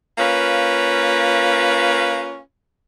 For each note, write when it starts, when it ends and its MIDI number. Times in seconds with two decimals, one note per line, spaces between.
0.18 2.38 58
0.18 2.38 61
0.18 2.38 65
0.18 2.38 71